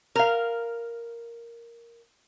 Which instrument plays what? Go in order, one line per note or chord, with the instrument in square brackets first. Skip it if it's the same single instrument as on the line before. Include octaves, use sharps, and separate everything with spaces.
[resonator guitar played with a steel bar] A#4 F5